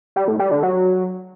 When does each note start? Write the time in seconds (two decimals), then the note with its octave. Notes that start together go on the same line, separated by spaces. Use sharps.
0.16 G3
0.28 A2
0.39 G3
0.51 D3
0.63 F#3